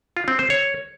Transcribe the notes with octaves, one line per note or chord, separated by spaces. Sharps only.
F4
C4
C5
C#5